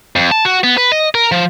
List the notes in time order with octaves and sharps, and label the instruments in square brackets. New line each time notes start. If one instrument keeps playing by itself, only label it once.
[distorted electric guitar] F2
A5
F#4
B3
B4
D#5
A#4
F3